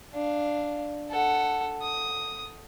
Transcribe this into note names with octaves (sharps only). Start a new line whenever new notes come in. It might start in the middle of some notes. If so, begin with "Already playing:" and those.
D4 F5
A4 F#5
D#6